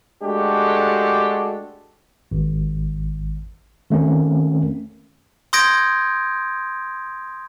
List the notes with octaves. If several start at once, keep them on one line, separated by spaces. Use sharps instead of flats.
G#3 A3 D4 F#4 G4 A4
G#1
D#3 A3 C4 C#4 A#4
C6 D#6 G6 G#6 A#6 D7